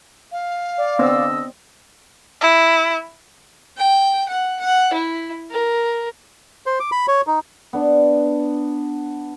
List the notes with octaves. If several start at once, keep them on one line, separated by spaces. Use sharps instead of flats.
F5
D5
D3 B3 C4 D#5 E6
E4
G5
F#5
F#5
E4
A#4
C5
D6
B5
C#5
D#4
B3 D4